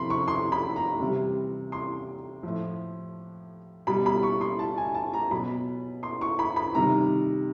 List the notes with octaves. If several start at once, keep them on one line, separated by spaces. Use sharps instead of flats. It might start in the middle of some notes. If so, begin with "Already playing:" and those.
Already playing: C3 F3 B5 C6
C#6
C6
B5
A#5
C3 E3 G3
C6
A2 F3
B2 G3 B5
B5
C#6
C6
A5
G#5
A5
A#5
B2 F#3 B5
C6
C#6
B5
B5
C3 D#3 G3 A#5